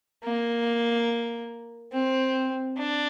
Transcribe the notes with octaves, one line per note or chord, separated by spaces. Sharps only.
A#3
C4
D4